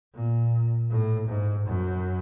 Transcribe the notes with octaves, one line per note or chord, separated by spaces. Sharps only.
A#2
A2
G#2
F#2